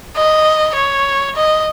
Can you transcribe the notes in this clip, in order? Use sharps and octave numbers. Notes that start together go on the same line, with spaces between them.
D#5
C#5
D#5